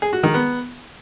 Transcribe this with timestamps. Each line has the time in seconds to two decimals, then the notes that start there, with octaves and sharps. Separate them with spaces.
0.02 G#4
0.13 F#4
0.23 D#3
0.34 B3